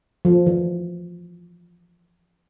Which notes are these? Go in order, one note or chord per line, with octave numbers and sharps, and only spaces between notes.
F3
E3